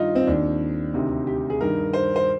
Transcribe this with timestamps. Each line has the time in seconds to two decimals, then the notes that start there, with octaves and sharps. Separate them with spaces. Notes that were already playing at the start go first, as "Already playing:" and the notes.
Already playing: G2 D#3 D#4 F4
0.15 C4
0.27 D#2 D#3 D4
0.94 D2 C3 D#3
1.27 G4
1.50 G#4
1.61 G2 D#3 A#4
1.93 C5
2.16 C5